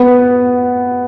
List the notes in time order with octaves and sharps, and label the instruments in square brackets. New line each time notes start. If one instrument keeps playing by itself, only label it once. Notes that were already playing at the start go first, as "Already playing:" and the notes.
Already playing: [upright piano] B3